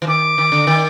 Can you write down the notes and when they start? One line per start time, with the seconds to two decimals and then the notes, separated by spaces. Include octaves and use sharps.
0.02 E3
0.07 D#3 D6
0.38 D#3
0.52 D3
0.67 D#3